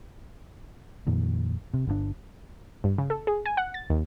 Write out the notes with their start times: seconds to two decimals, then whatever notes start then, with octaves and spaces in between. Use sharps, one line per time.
1.07 F2 A#2 D#3
1.74 C3
1.87 G1 C3 D4
2.84 G2
2.98 C#3
3.10 A4
3.27 G#4
3.46 G#5
3.57 F#5
3.74 A6
3.90 D#2